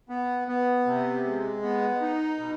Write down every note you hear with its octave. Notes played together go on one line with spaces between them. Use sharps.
B3
B3
C3
G#3
B3
D#4
B2